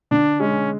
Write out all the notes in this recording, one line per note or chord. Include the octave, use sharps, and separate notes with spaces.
D3 D4
G#3 C#4